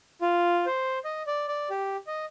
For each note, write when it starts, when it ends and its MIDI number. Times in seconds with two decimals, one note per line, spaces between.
0.22 0.65 65
0.66 0.99 72
1.05 1.23 75
1.27 1.47 74
1.48 1.69 74
1.70 1.97 67
2.07 2.25 75